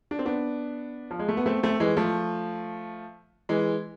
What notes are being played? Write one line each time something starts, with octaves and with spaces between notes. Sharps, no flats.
D4
C4
B3 D4
F3
G#3
A3
B3
A3 C4
A3 C4
E3 G#3
F3 A3
E3 G#3